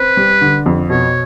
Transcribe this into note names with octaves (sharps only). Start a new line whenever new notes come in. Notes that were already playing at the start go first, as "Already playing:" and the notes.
Already playing: C4 B4
G3
D3
F2
B2 C#5